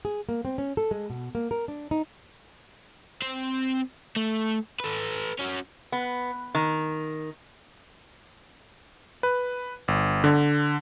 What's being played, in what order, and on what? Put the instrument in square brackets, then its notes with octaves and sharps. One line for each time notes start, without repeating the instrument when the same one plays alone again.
[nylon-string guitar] G#4
A#3
C4
C#4
A4
G#3
B2
A#3
A#4
D4
D#4
[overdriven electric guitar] C4
A3
A4 B4
C#4 F#4
[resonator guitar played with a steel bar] B3
D#3
[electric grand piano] B4
G1
D3